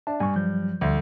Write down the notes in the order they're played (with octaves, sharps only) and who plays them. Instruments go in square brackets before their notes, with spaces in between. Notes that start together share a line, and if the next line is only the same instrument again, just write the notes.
[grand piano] D4 [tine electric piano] E5 A5
[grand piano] G2 [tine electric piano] G#5 C#6
[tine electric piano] F3 F#3 G6
[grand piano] D2 [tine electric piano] F3 G3